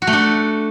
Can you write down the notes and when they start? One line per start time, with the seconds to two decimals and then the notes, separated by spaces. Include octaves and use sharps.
0.02 F#4
0.07 A3
0.13 D4